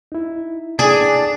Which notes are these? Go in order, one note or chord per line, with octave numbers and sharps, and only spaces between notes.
D#4 E4
D4 G#4 D5